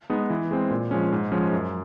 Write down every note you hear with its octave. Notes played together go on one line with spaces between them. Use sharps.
G#3 B3 D#4
E3
G#3 C4
A#2
F3 G#3 C#4
G#2
F3 G#3 C#4
F#2